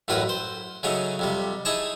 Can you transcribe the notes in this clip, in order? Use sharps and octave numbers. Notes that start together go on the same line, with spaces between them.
A1 F#2 A2 F#4 A#4 B4
C5
C#3 F#3 A3 C#4 D#4
F2 C3 G3
D#4 E4 G#4 C#5 A5 C#6